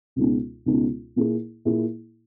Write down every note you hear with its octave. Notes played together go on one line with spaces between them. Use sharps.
C#2 B2 G#3 B3 D#4
C#2 B2 G#3 B3 D#4
A#2 A#3 E4 G#4
A#2 A#3 E4 G#4